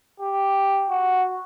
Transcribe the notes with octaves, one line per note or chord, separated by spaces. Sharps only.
G4
F#4